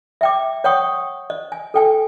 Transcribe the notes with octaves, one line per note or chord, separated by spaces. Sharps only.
E5 G5 D6
C#5 F#5 G5 C#6 D#6
D#5
G#5
A4 G5 G#5